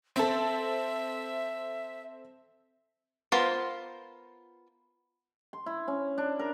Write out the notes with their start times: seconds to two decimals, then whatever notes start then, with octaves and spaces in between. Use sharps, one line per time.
0.16 C4 A4 E5
3.32 B3 F4 A#4 C5
5.53 C6
5.66 E4
5.88 C#4
6.18 D4
6.39 A#4